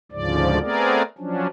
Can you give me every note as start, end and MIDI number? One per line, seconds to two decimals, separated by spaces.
0.12 0.59 38
0.12 0.59 44
0.12 0.59 49
0.12 0.59 53
0.12 0.59 74
0.61 1.03 57
0.61 1.03 59
0.61 1.03 60
0.61 1.03 68
0.61 1.03 70
0.61 1.03 74
1.18 1.47 53
1.18 1.47 54
1.18 1.47 61
1.18 1.47 62